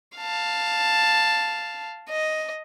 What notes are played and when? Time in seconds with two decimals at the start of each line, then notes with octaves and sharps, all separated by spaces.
0.17 F5 A5
2.10 D#5